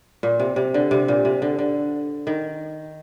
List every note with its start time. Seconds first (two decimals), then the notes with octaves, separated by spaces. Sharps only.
0.23 A#2
0.40 C3
0.56 C3
0.74 D3
0.91 C3
1.08 A#2
1.25 C3
1.42 D3
1.59 D3
2.27 D#3